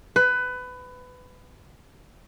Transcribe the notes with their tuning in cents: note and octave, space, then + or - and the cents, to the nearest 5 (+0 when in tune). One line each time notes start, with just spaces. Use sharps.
B4 +20